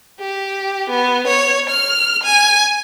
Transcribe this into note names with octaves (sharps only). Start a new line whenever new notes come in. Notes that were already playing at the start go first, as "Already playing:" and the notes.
G4
B3
C#5
F6
G#5